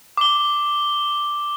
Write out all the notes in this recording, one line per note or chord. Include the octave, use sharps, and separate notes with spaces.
D6 G7